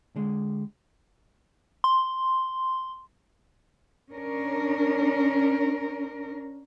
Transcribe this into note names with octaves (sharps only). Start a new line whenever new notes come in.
D3 G#3
C6
C#4 D4 A#4